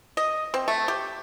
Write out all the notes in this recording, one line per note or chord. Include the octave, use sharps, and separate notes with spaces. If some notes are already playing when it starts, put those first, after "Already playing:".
D#5
C4
A3
G4